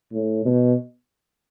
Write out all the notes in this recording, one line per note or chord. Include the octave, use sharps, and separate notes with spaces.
A2
B2